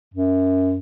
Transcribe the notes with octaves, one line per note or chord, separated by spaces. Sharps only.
F#2